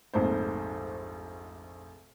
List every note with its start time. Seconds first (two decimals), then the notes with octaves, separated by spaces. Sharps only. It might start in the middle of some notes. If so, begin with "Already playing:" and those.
0.14 F1 A#1 G#2 A3 C5